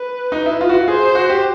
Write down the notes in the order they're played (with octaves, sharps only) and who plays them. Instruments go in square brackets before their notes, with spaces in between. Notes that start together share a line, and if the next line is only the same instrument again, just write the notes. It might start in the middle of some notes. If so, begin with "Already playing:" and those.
Already playing: [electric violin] B4
[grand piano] D#4
E4
F4
F#4
F4
[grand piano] G#4 [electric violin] C5
[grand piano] F#4
G4